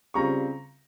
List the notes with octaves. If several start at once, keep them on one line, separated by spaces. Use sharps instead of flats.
C#3 G3 C4 F4 A#5 C#6